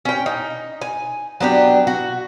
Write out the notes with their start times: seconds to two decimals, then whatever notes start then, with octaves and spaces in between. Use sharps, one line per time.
0.05 C#4 G5
0.26 D#4
0.81 G#5
1.40 F#3 B3 D4 G4
1.87 F#4